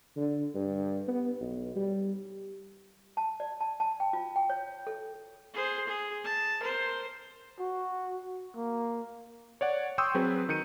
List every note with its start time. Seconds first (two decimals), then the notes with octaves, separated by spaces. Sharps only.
0.16 D3
0.54 G2
1.08 B3
1.41 B1
1.76 G3
3.17 A5
3.40 D5
3.61 A5
3.80 A5
4.00 G5
4.13 F4
4.36 G5
4.50 C#5
4.87 A4
5.54 G#4 C5
5.87 G#4
6.25 A5
6.60 A#4 C5
7.60 F#4
8.56 A#3
9.61 C#5 D5 F#5
9.98 G5 C6 C#6 D#6 E6 G6
10.14 F#3 C4 G#4 B4
10.49 D#3 G6 C#7 D#7